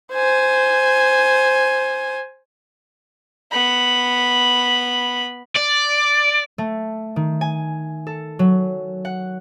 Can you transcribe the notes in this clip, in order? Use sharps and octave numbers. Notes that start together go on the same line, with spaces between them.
C5 G#5
B3 B5
D5
A3
D#3
G#5
A4
F#3
F#5